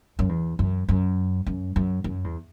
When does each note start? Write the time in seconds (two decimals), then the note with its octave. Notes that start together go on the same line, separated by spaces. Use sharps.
0.19 F#2
0.29 E2
0.59 F#2
0.89 F#2
1.47 F#2
1.76 F#2
2.04 F#2
2.24 E2